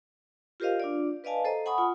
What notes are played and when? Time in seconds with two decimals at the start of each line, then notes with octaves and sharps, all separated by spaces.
0.60 F4 G4 A#4 C5 D#5 F5
0.80 D4 F4 D5
1.24 B4 D5 D#5 F5 G#5 A5
1.44 A4 C5 D#5 A#5
1.66 F#5 G#5 B5 C#6 D#6
1.78 F4